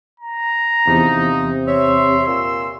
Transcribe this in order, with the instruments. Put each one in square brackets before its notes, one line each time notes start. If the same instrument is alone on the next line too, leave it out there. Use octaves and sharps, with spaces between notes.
[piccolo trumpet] A#5
[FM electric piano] E2 [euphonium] C3 [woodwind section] F3 D#4
[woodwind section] C#5 E5 [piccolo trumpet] C6
[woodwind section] A#2 E6